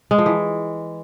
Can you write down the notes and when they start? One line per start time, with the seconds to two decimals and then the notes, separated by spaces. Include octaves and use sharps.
0.11 G#3
0.18 F3
0.26 E3